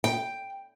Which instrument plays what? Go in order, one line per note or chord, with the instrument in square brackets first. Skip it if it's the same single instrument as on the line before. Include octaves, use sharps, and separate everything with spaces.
[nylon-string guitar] G5